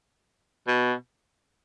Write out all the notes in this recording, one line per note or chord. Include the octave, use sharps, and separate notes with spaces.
B2